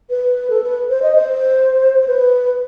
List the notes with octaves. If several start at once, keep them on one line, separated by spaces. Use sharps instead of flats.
B4
A4
B4
C5
D#5
C5
B4